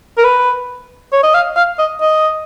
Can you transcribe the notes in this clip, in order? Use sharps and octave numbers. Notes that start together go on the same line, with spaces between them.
A#4
B4
C#5
D#5
F5
F5
D#5
D#5